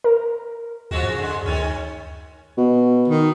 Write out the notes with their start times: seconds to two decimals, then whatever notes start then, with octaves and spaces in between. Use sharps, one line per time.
0.04 A#4
0.91 D#2 F3 G#3 F#4
1.03 F#2
1.18 D3 G#3
1.46 D2 D#3 C#4
2.57 B2
3.08 D#3